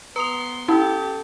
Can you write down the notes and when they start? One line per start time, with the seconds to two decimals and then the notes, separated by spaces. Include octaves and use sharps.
0.16 B3 B4 A#5 C6 D#6 C#7 F7
0.68 C#4 E4 G4 A4 A5 E6